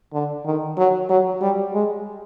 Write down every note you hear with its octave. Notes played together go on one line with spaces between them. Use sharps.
D3
D#3
F#3
F#3
G3
G#3